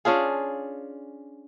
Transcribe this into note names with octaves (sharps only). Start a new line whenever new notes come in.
C#4 D4 F4 G#4